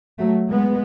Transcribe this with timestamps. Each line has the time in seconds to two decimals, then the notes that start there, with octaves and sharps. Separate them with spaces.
0.18 F#3 A3
0.48 G#3 B3